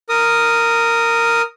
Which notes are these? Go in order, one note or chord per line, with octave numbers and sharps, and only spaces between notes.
A#4 D#6